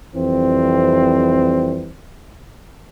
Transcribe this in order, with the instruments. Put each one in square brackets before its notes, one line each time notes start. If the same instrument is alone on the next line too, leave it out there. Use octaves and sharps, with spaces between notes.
[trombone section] F2 E3 G3 C4